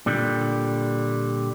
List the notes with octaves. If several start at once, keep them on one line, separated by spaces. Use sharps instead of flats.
A#2 D3 G3